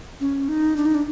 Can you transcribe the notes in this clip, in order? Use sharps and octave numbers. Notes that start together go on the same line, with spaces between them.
C#4
D#4
D4
D#4
D4